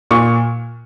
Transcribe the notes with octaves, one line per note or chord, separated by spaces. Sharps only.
A#2 C#6